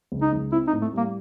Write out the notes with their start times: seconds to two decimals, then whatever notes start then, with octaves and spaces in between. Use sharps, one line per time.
0.12 C#2
0.22 D#4
0.33 C#2
0.52 C4 E4
0.67 D#4
0.73 A2
0.82 A3
0.93 G3 A#3